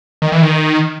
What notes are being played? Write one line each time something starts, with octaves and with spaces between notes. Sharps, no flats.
D#3
E3
D#3